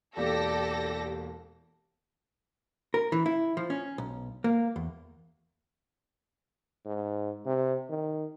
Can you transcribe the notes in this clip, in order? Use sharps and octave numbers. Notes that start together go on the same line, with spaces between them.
E1 A#3 G4 A4 D5 A#6
A#4
E3
E4
F3
C#4
B1
A#3
E2
G#2
C3
D#3